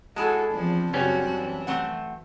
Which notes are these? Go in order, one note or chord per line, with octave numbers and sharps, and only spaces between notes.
G#3 E4 F#4 G#4 A4 A5
E2 F3 C4 D4
F#2 C#3 G3 B3 C#4 F#4
E3
A3 C4 F#5